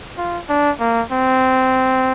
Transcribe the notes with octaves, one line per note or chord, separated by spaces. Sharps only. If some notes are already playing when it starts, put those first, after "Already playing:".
F4
D4
A#3
C4